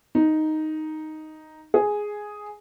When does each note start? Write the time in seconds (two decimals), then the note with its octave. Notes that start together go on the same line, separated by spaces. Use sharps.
0.15 D#4
1.74 G#4